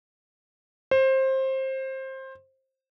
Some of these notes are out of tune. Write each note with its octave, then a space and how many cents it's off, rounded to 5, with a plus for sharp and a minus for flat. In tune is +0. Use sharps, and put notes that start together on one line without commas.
C5 +20